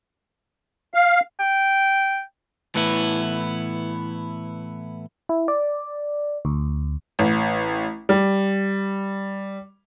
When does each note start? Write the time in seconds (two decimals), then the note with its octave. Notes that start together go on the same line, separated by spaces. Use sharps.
0.94 F5
1.39 G5
2.75 A2 E3 B3 E4
5.29 E4
5.48 D5
6.45 D2
7.19 A1
8.09 G3